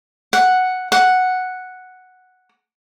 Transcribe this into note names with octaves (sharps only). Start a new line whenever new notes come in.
F#5
F#5